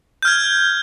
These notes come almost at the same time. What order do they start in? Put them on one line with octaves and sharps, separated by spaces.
G6 F6 G#6